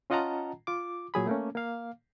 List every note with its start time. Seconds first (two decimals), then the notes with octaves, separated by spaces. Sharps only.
0.10 C#4 F4 D#5 F#5 A5 A#5
0.67 F4 D6
1.14 A#2 F#3 G#4 B5
1.27 A3 A#3 C#4
1.55 A#3 F5